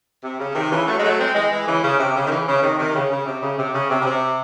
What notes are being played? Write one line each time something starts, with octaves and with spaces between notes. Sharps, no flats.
C3
C#3
C3 D#3
C#3 E3
F#3 A3
G#3
F#3 A3
G#3 C4
E3 G#3
E3 G#3
C#3 E3
C#3
C3
C#3
D#3
C#3 E3
C#3
C3 D#3
C3 D#3
C#3
C#3
C3
C#3
C3
C#3
C3
C#3
C3